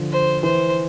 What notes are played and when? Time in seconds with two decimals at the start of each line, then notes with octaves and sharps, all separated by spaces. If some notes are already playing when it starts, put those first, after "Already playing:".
Already playing: D3 F3
0.12 C5
0.43 E3 C5